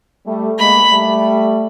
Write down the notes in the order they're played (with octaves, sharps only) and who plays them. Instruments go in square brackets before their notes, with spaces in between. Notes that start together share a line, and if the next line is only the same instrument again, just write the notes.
[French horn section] G3 A3
[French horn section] G#3 A#3 [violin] B5
[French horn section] G3 A3